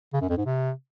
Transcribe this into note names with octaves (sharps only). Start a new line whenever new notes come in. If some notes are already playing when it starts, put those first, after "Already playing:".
C#3
F#2
F2
G#2
C3